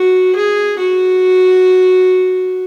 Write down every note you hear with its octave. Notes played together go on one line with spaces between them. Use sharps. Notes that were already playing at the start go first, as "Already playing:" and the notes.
Already playing: F#4
G#4
F#4